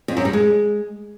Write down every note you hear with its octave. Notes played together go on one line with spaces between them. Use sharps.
F2
F#2
G3
G#3